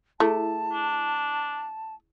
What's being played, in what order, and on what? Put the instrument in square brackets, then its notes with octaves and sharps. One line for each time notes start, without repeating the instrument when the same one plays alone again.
[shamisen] A3 [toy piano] E4 G#4 [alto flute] A5
[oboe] D4